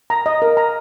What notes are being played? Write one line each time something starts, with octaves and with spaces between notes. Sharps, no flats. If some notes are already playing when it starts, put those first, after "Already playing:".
A#5
D#5
A#4
A#5